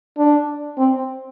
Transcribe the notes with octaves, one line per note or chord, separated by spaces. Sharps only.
D4
C4